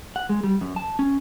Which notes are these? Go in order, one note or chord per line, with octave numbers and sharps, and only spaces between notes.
F#5
G#3
G3
F#2
A5
C#4